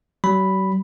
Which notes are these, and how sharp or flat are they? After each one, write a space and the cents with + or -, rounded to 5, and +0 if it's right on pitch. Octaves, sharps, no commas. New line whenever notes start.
F#3 +45 B5 +0